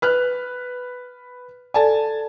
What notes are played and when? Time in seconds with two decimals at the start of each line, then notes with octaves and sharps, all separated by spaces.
0.02 B4 F6 F#6
1.74 A4 D5 G#5 A5